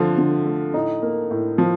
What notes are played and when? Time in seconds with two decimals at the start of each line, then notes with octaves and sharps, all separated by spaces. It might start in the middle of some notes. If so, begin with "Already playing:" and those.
Already playing: D3 F3 A3
0.18 D3
0.46 A3
0.74 A2 D#4
1.02 A#3
1.31 A2
1.58 F3